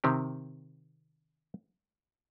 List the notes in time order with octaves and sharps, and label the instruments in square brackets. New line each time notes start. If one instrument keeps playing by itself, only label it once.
[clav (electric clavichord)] C3 D#3 C4 G4